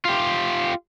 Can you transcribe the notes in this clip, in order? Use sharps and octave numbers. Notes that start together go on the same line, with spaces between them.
F4 G4